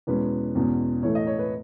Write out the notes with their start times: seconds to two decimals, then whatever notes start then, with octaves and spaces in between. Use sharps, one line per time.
0.07 E2 B2 G#3 C#4 B4
0.55 E2 B2 G#3 C#4
1.03 A2 E3 A3 C#5
1.15 D#5
1.27 C#5
1.39 B4